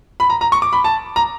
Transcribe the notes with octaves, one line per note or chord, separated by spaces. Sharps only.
B5
A#5
A#5
C#6
D6
B5
A5
A#5